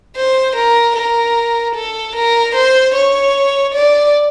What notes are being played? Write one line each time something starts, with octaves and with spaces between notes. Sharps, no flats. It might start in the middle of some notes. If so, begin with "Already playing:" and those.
C5
A#4
A#4
A4
A#4
C5
C#5
D5